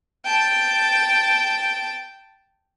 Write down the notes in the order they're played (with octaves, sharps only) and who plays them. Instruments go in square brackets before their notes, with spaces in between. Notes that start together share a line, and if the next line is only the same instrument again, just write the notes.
[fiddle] G5 A5